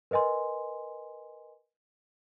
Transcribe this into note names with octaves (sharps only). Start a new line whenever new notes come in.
A#4 B4 D#5 G#5 C6